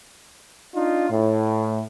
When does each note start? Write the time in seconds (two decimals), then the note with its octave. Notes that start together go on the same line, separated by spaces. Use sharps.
0.75 D4 D#4 F4
1.10 A2